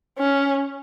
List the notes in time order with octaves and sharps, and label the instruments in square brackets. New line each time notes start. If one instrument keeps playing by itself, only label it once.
[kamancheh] C#4